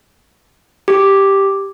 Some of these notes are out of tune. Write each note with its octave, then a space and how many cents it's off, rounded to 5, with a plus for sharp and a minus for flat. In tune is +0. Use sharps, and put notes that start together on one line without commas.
G4 +0 D6 +0